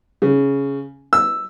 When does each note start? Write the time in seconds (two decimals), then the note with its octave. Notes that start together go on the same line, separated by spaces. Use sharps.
0.22 C#3
1.13 E6